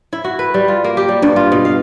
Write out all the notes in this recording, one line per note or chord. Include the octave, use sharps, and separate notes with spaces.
E4
F#4
B4
G3
F4
A#3
G4
G3
G2
F4
B2
F5